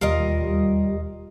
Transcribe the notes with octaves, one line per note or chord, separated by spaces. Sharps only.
E1 D#2 G3 F4 A#4 D#5